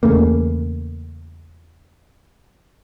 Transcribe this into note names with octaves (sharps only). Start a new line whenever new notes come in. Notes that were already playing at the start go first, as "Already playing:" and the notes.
E2 C#3 A3 A#3